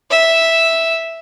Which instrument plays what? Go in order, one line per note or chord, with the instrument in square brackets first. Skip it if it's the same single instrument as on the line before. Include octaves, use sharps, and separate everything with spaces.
[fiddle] E5